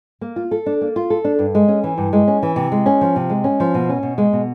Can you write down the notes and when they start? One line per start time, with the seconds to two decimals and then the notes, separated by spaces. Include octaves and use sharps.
0.21 A#3
0.36 F4
0.51 A4
0.66 D4
0.81 A#3
0.96 F4
1.10 A4
1.24 D4
1.39 G2
1.55 G#3
1.68 C#4
1.84 E3
1.98 G2
2.13 G#3
2.27 C#4
2.43 E3
2.56 C3
2.72 G#3
2.86 C#4
3.01 F3
3.16 C3
3.30 G#3
3.44 C#4
3.60 F3
3.74 B2
3.89 C#4
4.03 B2
4.18 G#3
4.33 B2